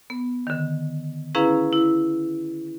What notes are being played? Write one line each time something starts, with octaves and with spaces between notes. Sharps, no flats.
B3
D3 D#3
C#4 E4 G#4 B4 F5 A#5
E4